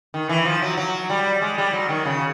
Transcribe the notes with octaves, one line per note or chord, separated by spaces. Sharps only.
D#3
E3
F3
F#3
F#3
G3
G#3
G3
F#3
D#3
C#3